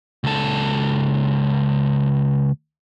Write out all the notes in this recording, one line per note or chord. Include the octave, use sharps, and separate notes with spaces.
C#2 A4